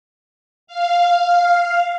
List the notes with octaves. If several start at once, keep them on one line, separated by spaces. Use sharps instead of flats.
F5